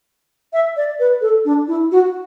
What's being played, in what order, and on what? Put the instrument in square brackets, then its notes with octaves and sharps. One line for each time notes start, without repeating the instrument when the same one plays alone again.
[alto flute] E5
D5
B4
A4
D4
E4
F#4